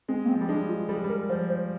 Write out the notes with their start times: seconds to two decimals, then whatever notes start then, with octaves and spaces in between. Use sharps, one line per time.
0.08 G#3 C4
0.25 A#3
0.29 C4
0.33 F3
0.41 G3
0.49 G#3 D4
0.69 F4
0.89 G3 G#4
0.96 G#3
1.04 G3
1.09 A#4
1.29 F3 C5
1.49 C5